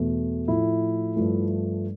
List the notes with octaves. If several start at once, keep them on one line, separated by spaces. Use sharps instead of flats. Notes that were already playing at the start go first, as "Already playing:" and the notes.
Already playing: E2 B2 A3
A2 F3 A3 E4
G2 F3 A3